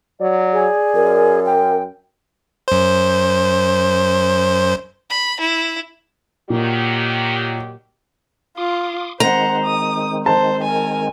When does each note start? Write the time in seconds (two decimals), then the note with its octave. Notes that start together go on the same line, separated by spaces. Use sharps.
0.21 F#3 D5
0.53 G#4
0.95 F#2 A#4
1.46 G5
2.68 F#2 C5
5.10 B5
5.41 E4
6.50 A#2 D#3 F#3 G4
8.57 F4 C6 D6 D#6
9.20 D#3 G#3 C4 C5 F#5 A#5
9.65 D#6
10.26 C5 A5
10.64 A#4 G#5